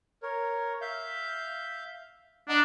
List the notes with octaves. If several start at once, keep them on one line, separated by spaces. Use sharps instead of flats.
A#4 C#5
E5 F5 G6
D4 D#5 F#5 A#5